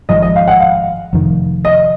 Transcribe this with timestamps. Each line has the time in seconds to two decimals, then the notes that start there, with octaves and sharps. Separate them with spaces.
0.09 G#1 G#2 F3 G#3 D#5
0.22 D#5
0.36 F5
0.48 F#5
0.60 F5
1.13 F1 F2 D#3
1.65 D#5